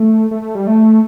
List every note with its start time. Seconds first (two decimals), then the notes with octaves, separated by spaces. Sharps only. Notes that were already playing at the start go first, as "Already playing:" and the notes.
Already playing: A3
0.31 A3
0.42 A3
0.55 G3
0.67 A3